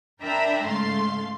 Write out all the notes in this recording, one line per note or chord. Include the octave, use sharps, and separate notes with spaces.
D4 A#4 E5 G5 A#5 B5
G#2 C#3 A3 F5 C6